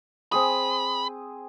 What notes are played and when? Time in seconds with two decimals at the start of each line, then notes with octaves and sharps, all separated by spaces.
0.32 C4 G#4 B5 D#6